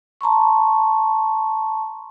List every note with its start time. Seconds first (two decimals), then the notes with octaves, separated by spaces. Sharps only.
0.21 A5 A#5 C6 C#6